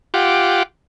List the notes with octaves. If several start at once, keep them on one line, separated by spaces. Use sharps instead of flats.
F4 G4 F#5 D6